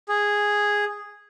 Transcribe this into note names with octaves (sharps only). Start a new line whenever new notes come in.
G#4